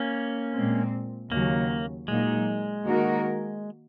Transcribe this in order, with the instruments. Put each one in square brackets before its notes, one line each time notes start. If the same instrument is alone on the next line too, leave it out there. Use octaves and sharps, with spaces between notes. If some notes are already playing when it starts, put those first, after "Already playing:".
Already playing: [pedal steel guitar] A#3 C#4
[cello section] A#2 G#3 C4
[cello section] D#2 C#3 F#3 [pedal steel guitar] A#3
[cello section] A#2 F#3 A#3 D#4 [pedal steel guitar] G#3
[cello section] D#3 A#3 D#4 F#4 A#4